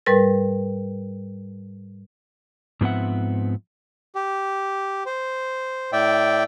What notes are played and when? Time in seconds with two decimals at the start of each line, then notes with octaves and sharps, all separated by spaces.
0.06 G#2 G3 A#4 B4 A6
2.81 G#2 F3 B3 C4 E5 F#5
4.15 G4
5.06 C5
5.92 A2 D5 E5 G5